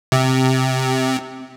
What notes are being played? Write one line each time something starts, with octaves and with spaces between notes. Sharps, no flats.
C3